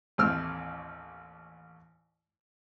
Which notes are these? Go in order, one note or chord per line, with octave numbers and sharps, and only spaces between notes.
A1 D#2 A3 C4 E6 F6